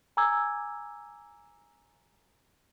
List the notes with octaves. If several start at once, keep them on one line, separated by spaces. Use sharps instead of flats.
G#5 A#5 D6 E6 G#6